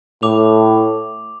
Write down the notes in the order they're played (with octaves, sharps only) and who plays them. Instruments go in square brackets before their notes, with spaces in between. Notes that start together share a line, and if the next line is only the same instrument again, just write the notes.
[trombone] A2 [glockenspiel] D6 F7